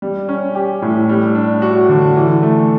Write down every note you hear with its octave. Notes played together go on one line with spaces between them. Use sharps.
G3
C#4
G4
A2
G3
D4
F#4
D3
E3
A3